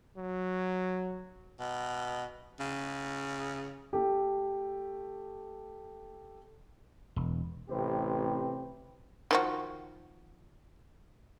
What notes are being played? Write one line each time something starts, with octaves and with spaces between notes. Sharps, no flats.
F#3
B2
C#3
A3 G4
E1
A1 C3 C4 G4 B4
D#3 F3 F#4